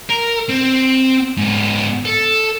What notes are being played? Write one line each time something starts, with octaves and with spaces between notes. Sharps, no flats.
A#4
C4
G#2 B3
A4